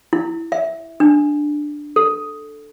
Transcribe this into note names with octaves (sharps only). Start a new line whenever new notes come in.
E4
E5
D4
A4